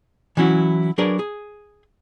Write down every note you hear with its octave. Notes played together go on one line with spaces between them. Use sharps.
E3 F#3 C#4 E4 F#4
F#3 D4 G#4 A#4 B4 D5
G#4